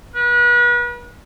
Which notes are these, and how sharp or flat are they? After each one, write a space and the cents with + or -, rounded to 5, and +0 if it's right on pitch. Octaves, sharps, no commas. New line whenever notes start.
B4 -35